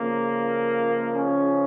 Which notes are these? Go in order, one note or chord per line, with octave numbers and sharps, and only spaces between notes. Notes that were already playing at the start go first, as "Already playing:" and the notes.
Already playing: C#2 C#3 F3 A#3
C#4